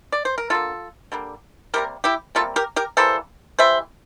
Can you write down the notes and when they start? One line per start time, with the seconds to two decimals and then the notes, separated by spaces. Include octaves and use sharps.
0.12 D5
0.25 C5
0.38 A#4
0.50 D3 G3 F4 A4
0.55 A#3
1.12 D3 G3 A#3
1.74 C3 G3 A#3 G4 A#4
2.04 E4 G4
2.35 C3 G3 A#3 F4 A4
2.56 G4 A#4
2.76 G4 A#4
2.97 E3 G3 A#3 A4 C5
3.59 E3 G3 C5 E5